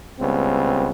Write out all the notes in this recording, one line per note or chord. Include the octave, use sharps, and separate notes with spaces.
C#2 G3 B3 C4